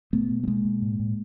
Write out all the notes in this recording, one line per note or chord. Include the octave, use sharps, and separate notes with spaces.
B2 A3 B3
B2
A3
B2 G#3 A#3
B2
A2
A2